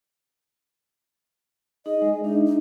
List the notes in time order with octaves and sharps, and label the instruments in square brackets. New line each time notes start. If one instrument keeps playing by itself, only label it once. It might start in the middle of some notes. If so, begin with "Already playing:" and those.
[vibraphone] D#4 G#4 [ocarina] D#5
[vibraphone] G#3
[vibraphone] D4 E5 [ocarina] D#4
[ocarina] D#4